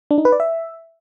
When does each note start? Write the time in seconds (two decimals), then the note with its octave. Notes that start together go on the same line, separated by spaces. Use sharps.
0.11 D4
0.18 D#4
0.25 B4
0.32 D5
0.40 E5